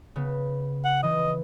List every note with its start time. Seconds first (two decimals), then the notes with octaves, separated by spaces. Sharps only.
0.16 C#3 B3
0.85 F#5
1.03 C#3 E3 D#5